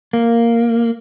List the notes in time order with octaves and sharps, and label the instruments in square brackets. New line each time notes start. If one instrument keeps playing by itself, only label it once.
[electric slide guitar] A#3